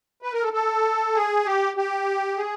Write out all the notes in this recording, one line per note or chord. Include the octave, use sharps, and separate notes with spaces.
B4
A#4
A4
A4
G#4
G4
G4
G#4